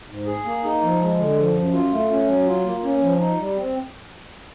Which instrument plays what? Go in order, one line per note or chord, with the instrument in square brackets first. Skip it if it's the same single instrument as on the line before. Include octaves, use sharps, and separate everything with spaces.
[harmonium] G#2
G#4
A#3
D#4
F3
G#3
D3
F3
F#2
F4
A3
C#4
F#3
F4
A#3
C#4
F3
D#4
G3
C4